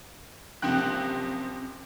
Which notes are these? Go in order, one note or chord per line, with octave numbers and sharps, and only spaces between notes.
F#1 C3 F3 C4 G5 F#6